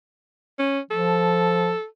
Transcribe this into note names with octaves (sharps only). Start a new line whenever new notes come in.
C#4
F3 A4